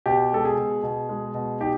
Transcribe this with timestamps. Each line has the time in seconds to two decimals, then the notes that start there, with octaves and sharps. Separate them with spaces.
0.06 B2 G4
0.32 G#3 A4
0.45 G#4
0.58 B2
0.83 B2
1.09 G#3
1.34 B2
1.60 D#4 G4